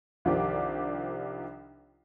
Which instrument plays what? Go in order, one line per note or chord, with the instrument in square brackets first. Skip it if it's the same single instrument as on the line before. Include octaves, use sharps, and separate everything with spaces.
[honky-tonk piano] C2 D#3 F3 D4 G4 D6